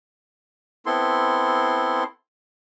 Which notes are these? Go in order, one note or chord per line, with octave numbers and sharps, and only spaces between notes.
B3 C4 E4 A4 C6